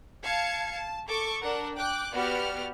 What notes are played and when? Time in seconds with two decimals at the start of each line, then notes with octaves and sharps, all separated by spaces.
0.22 F5 A5 G#6 C#7
0.71 A5
1.08 A4 C#6 D6
1.42 D4 A#4 F#5
1.77 G5 D6 F#6
2.13 B3 F#4 G4 D5 F6